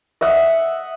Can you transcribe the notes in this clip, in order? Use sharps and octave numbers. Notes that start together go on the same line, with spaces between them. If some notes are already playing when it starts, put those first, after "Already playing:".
D#5 E5 F#5